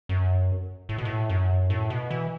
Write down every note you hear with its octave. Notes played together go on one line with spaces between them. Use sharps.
F#2
A2
B2
A2
F#2
A2
B2
E3